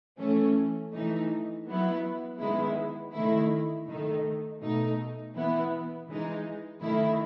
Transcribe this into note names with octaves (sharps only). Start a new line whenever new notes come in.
E3 A3 C#4
E3 A3 D#4
F#3 B3 E4
D#3 G#3 B3 E4
D#3 A3 E4
D#3 A3 D#4
B2 A3 D#4
E3 B3 E4
E3 G#3 D#4
D#3 A3 E4